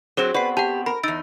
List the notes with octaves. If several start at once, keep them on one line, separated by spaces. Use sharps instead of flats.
F#3 C4 F#4 G#4 C5 E7
B2 C4 F#4 B4 D5 C7
G4 F#5 A5
A#4 B5
E2 D#4 E6 A6 D7